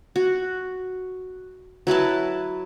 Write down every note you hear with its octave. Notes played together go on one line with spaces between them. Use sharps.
F#4
F#3 E4 B4 A5